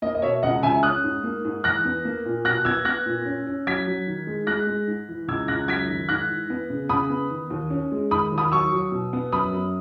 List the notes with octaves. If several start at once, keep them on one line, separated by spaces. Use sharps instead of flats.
A#3 D#5
D#5
B2 C#5 E5
C#2 D#5 F#5
C#2 E5 G#5
C#4 D#6 F#6
G#2
A#3
G#2
E2 F#6 A#6
B3
A#3
A#2
B2 F#6 A#6
B3 E6 G#6
B3 F#6 A#6
A#2
C#4
C#4
F#3 G#6 B6
F#3
D#3
G#3
G#3 F#6 A#6
G#3
G#2
E3
C#2 E6 G#6
C#2 F#6 A#6
F#2 G#6 B6
D#3
G#2 F#6 A#6
E3
B3
C#3
C#3 B5 D#6
B3
D#3
D#2
C#4
G#3
D#3 B5 D#6
D#2
B5 D#6
F#3 C#6 E6
F#3
B2
B3
F#2 B5 D#6
F#2